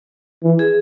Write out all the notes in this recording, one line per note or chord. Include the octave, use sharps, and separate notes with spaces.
E3
G#4